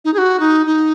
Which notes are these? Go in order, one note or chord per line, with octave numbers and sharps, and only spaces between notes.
D#4
G#4
F#4
D#4
D#4